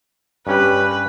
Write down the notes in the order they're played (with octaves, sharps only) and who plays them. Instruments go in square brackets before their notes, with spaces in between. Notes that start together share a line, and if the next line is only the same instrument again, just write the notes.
[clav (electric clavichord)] G2 C#4 G4 [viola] B4